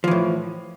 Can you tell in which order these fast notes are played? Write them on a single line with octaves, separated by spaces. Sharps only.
F3 E3 A2